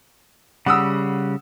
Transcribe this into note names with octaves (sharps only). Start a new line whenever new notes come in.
C#3 G3 F#5 D#6 E6